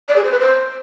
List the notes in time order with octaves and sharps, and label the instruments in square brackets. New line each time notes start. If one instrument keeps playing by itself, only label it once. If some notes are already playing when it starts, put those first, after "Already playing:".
[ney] D5
G#4
C5
B4
C5